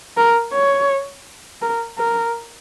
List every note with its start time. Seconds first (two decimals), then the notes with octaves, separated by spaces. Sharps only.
0.17 A#4
0.53 C#5
1.62 A#4
1.98 A#4